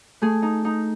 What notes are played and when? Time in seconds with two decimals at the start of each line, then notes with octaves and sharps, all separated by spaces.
0.22 A3 G#4
0.42 D#4
0.65 D#4